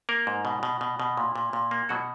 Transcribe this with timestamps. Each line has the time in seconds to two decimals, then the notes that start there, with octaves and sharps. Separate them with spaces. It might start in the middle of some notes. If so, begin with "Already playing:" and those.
0.09 A#3 A#4
0.27 G#2
0.45 B2
0.63 B2
0.81 B2
1.00 B2
1.17 A#2
1.36 A#2
1.53 A#2
1.71 A#3
1.89 B2 F#3 F#4